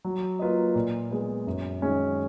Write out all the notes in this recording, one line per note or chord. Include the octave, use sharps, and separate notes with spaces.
F#3
A#3 F4 B4 D#5
A#2
G#3 B3
F#2
D#3 G#3 C#4